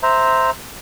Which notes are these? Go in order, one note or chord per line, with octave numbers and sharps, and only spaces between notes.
C5 E5 A#5